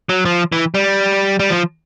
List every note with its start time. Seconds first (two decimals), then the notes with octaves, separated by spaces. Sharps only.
0.09 F#3
0.25 F3
0.52 E3
0.74 G3
1.39 G3
1.50 F3